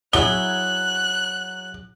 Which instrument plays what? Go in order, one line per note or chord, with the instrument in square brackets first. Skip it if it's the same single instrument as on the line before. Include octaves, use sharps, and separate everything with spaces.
[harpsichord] F#3 G#4 E5 [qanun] E4 [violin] F#6 [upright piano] G7